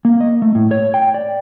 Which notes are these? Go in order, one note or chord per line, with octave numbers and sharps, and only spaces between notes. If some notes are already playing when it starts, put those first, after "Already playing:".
A#3
D#5
A3
A2
C#5
G5
D5